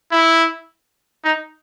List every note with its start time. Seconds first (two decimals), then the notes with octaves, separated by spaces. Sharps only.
0.11 E4
1.24 D#4